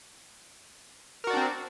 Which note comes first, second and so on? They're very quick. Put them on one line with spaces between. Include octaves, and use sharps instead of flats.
A#4 F#4 D5 D4 C4